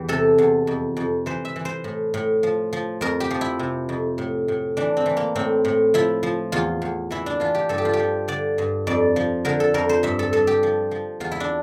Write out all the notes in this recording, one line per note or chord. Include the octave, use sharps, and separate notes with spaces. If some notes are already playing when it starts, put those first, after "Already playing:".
Already playing: E2 E3 G4
C3 A4
E2
F2
F2
E3 C5
E5
E3
C5
A2
A2
F3
F3
F2 A#4
G4
F3
E4
C3
F2
A2
A2
E3 D4
C4
E3
A#3
A2 C4
A2
F3 E4
F3
E2 F4
E2
E3 E4
D4
E3 F4
G4
G2 A4
G4
F4
G4
F3
D3 D5
G2
F2 D5
F3
D3 A#4
A4
F2 A#4
C5
G2 E5
A4
G2 A4
G4
F3
F3
E2 F4
E4
D4